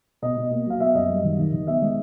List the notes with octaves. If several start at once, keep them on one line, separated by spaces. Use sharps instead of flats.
B2 D#5
B2
A#3
F#3 F5
B3 E5
F#2 D#5
G3
D#3
D#3
D#3
B3 E5
G#3 D#5